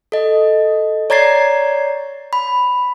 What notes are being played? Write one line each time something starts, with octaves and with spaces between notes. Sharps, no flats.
A4 D#5
C#5 D5 A#5 G#6 A6 C7
B5